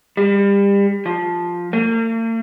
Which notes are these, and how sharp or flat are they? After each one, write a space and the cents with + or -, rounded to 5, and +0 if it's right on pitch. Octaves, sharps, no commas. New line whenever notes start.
G3 +30
F3 +5
A#3 -45